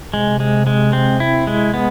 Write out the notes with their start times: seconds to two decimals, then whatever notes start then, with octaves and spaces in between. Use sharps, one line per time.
0.13 C3 G#3
0.40 G#3
0.67 G#3
0.93 C4
1.20 E4
1.47 G#3
1.74 B3